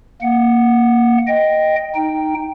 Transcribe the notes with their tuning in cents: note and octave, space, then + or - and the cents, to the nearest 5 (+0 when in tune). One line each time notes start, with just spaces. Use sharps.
A#3 +0 F#5 +0
D#5 +0 G5 +0
D#4 +0 G5 +0